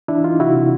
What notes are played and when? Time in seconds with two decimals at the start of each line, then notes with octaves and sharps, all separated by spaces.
0.08 E3 D4 E4
0.24 E3 D#4 F4
0.40 C3 E4 F#4
0.55 C3